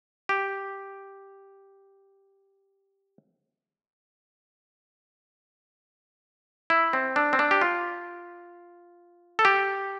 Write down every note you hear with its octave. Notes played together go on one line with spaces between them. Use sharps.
G4
E4
C4
D4
C4
D4
G4
F4
A4
G4